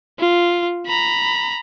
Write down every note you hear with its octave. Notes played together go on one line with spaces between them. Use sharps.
F4
A#5 B5